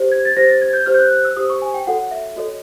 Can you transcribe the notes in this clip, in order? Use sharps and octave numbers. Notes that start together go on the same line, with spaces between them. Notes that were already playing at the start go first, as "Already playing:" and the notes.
Already playing: G4 C5
G#6
A6
G4 C5 A#6
A6
G#6
G6
G4 C5 F6
G6
F#6
F#6
E6
G4 C5 D#6
C#6
G#5
G5
F#4 A4 C#5 F#5
E5
F#4 A4 C#5 D#5